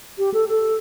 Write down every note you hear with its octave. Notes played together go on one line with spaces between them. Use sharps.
G4
A4
A4